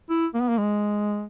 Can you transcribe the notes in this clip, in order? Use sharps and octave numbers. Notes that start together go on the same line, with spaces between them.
E4
A#3
B3
A#3
G#3